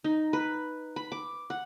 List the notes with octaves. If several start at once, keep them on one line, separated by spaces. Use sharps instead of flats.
D#4
B4
B5
D6
F#5